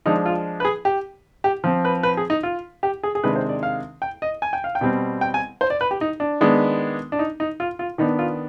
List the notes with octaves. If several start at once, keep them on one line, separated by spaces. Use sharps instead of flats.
F3 G#3 D4 D#4
F4
B4
G#4
G4
G4
F3 C4
B4
B4
G#4
D#4
F4
G4
G#4
G#4
C3 D#3 G#3 D4 B4
C5
D5
F5
G5
D#5
G#5
G5
F5
G5
B2 G3 C4
G5
G#5
C5
D5
B4
G4
D#4
D4
D#3 G#3 B3 D4
D4
D#4
D#4
F4
F4
D#3 B3 D4 D#4
F4